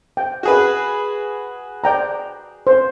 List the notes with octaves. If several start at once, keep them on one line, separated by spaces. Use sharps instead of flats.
G5
F#4 G#4 B4
D5 G5 A#5
C5